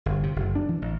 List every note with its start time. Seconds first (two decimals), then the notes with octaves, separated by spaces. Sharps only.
0.06 G1
0.23 C3
0.36 F#1
0.55 D4
0.69 E3
0.82 A1